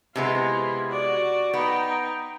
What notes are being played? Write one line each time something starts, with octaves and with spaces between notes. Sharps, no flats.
C3 G#3 B3 E4 F4
F#4 D5
B3 D#4 G5